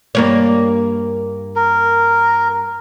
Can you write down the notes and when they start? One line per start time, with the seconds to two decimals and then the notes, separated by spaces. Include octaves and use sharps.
0.15 G2 A#3 C#5
1.56 A#4